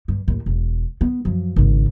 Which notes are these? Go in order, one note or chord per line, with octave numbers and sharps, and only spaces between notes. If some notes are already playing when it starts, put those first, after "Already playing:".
G2
D#2 A2
E1
B3
F#2 F3
G#1 C#3